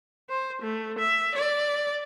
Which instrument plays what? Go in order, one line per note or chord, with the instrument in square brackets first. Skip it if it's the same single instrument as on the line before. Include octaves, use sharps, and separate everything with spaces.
[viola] C5
A3
E5
D5